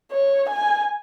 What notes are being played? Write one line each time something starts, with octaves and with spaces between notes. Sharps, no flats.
C#5
G#5